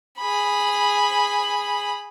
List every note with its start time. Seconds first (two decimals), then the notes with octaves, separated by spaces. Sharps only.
0.19 G#4 B5